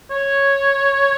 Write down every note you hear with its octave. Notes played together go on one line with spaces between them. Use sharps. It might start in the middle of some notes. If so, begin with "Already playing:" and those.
C#5